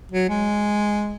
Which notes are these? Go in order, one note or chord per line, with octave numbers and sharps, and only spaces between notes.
F#3
G#3